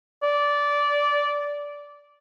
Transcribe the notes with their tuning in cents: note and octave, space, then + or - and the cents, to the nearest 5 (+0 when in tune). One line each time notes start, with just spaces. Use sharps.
D5 -15